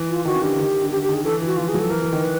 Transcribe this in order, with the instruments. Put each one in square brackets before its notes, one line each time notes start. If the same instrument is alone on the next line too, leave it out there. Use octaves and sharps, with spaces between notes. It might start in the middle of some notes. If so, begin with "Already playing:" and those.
Already playing: [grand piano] E3
[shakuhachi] F4
[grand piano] D#3 [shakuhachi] F#4
[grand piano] C#3
[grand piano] D3 [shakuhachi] G4
[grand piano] D#3
D3
[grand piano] D3 [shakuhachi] G4
[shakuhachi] G4
[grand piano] D#3
[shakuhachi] G#4
[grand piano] E3 [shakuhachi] A4
[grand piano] E3 [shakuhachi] F#4
[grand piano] F3 [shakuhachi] F4
[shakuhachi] G#4
[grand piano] F#3
[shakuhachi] A4
[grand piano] E3 [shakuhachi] A#4
[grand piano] E3
D#3
[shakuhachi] B4